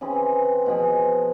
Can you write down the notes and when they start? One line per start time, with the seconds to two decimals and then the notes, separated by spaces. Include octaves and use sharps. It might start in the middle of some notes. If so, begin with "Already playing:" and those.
0.01 C#3 E3 C4 G#4
0.66 B2 F3 G#4